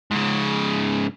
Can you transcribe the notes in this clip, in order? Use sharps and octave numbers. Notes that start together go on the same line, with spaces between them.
G#2 C#3